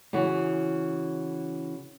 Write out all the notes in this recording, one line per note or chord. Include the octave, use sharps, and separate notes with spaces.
C#3 E3 F#4